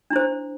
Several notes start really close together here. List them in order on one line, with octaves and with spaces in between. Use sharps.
D4 E4 C5